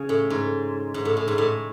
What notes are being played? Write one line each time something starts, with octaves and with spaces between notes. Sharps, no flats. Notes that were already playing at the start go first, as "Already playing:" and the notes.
Already playing: C#3
A2
G#2
G#2
A2
A2
G#2
A2